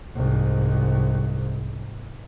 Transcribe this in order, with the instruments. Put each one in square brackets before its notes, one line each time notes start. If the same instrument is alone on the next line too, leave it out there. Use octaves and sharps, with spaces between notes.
[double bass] C2 G#2